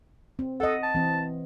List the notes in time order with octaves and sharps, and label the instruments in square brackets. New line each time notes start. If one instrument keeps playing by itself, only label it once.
[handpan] C4
[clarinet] A4 [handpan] D#5 F#5
[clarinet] A5
[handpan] E3 C4